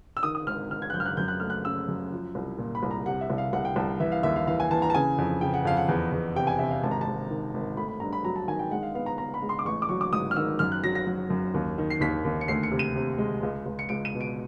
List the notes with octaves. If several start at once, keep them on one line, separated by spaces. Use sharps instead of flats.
E6
D#3 D#6
D#6
G#1 F6
D#3 F6
G#6
F#6
F#2 G6
F6
F#6
F#2 G6
F#6
A3 F6
F#6
C#3 E6
F#2
F3
C2
A#2
B5
C2
A#5
C3 F#5
E5
C2
F5
C2 F#5
G5
C2 A5
E3 E5
F5
D#2 E5
F5
E3 F5
G#5
E3 A5
A#5
A5
C#3 G#5
F2
C#3 G5
F#5
F2 F5
F#5
E2
E2
C3 G5
G#5
C3 E5
F5
G#1 A5
A#5
A5
G#1
D#3
G#1
A3 B5
B5
G2 A#5
B5
F#3 A#5
A5
D#3 G#5
G5
G#3 F#5
F5
B3 F5
A#5
B3 A#5
B5
G#3
C6
D6
A1 C#6
D6
F#3 C#6
D6
G#2 D#6
F6
D#3 E6
F#2 F6
F#6
F#3 A#6
A#6
F#3
F#2
D#2
D#3
C7
D#2 B6
D#2
C#7
D2 C7
C#7
C3
D#7
C3
G#3
C#2
C#2
C#7
C#2 D7
D#7
B2
D7